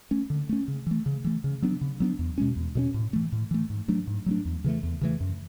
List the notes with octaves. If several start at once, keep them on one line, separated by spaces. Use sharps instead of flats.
A3 C#4
D3
A3 C#4
C#3
E3 A3
C#3
E3 A3
C#3
F#3 B3 D4
C#3
F#3 B3 D4
E2
B2 G#3 C#4
E2
B2 G#3 C#4
A2
E3 A3
A2
E3 A3
G#2
F#3 A3 D4
G#2
F#3 A3 D4
E2
C#3 E3 A3
E2
C#3 E3 A3
F#2